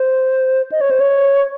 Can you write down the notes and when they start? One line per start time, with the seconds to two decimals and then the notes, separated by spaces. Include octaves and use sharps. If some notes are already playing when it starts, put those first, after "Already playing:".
Already playing: C5
0.72 D#5
0.81 C#5
0.91 C5
1.00 C#5